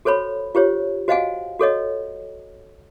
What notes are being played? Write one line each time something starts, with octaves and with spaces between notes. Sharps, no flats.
F#4 A4 C5 C#5 B5
F4 G4 C5 C#5
F#4 C5 D#5 F5 F#5 G#5
F#4 A4 C#5 D#5